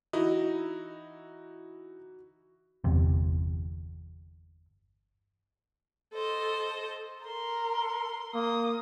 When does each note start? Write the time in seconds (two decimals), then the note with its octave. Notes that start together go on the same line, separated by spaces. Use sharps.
0.13 E3 D#4 E4 F#4 D#5
2.84 G1 E2 C3
6.12 A4 C5 D#5
7.26 A#4 C6
8.34 A#3 D#6